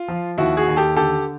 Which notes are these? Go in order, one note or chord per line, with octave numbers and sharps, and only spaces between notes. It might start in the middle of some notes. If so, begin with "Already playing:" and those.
Already playing: F4
F3
D#2 E4 F#4
F#4 G#4
D#2
G4 A4
D3 G4 A4